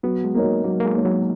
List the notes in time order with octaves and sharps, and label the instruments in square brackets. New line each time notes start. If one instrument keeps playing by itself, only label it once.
[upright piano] F#3 [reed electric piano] B3
[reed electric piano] G#3
[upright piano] A#3 D#4 A#4 C#5
[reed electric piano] F#3
[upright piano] F#3 [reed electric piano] A#3
[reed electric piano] A#3
G#3
[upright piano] A#3 D#4 A#4 C#5
[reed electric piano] F#3